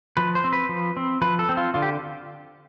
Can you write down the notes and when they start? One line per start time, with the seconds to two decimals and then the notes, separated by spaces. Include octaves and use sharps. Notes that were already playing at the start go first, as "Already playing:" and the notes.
0.17 F3 B4
0.35 C5
0.44 C4
0.53 B4
0.69 F3
0.97 C4
1.22 F3 B4
1.39 A4
1.49 C4
1.57 F4
1.74 D3 F4
1.82 G4